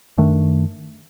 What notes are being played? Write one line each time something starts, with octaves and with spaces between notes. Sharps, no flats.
F#2 D#3 A3 D4